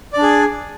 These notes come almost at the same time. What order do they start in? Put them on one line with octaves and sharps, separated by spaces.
D5 D4 G#4